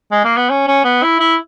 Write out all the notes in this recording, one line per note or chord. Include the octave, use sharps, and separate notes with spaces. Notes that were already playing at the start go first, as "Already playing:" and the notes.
G#3
A#3
B3
C#4
C#4
B3
E4
E4